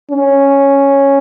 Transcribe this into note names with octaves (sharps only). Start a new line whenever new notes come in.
C#4